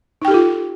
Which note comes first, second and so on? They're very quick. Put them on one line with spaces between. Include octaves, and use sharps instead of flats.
D#4 G5 G4 A4 F4